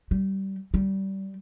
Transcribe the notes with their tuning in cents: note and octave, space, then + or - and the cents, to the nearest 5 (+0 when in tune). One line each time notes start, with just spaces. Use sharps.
G3 -20
G3 -20